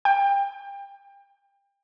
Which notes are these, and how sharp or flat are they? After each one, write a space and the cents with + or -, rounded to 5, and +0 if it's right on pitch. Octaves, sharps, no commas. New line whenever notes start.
G5 +30